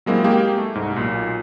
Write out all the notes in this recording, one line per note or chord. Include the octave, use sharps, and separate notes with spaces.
F#3 G#3 A#3 C4 E4
G#3 A#3 G4 G#4 A#4 G5
A3
C2 G#2
B1 A#2